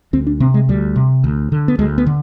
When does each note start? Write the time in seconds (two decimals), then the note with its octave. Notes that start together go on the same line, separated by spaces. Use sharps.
0.13 D2 C4
0.27 D4
0.40 C3 C4
0.54 G#3
0.69 D2 G3
0.96 C3
1.24 D2
1.52 D3
1.68 B3
1.79 D2 G#3
1.98 B3
2.07 D3